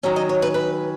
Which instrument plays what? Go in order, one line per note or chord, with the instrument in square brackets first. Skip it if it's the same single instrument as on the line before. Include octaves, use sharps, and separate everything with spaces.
[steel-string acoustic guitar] D#3 F#3 C#4
D#5
C#5
B4
B4